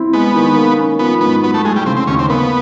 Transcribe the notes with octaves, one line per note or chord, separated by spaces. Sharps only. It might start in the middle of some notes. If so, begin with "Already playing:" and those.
Already playing: C4 E4
G#3 B3
D#3
A#3
C#4
F3 B3
G#2 B3
F#3 B3
A3
G#3 A3
G3
C#3 C4
C4
D#2 C#4
C4
A#3 B3